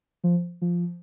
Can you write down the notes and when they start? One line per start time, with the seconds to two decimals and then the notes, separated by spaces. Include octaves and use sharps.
0.24 F3
0.62 F3